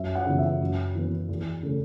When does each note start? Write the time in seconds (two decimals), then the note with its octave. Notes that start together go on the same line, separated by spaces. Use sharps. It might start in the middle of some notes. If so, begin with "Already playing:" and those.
Already playing: F#2 E5
0.15 F#5
0.27 C#3 E3 B3
0.38 E5
0.61 F#2
0.95 E3 B3
1.29 E2
1.63 C#3 A3